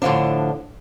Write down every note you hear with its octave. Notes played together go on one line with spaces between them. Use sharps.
A2 D3 D#3 F3 D4